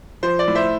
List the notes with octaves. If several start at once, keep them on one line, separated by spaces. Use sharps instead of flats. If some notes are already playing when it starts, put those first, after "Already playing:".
F3 C5
D5
A2
C5 E5